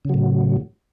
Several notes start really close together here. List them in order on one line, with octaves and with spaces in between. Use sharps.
C#3 F#3 A2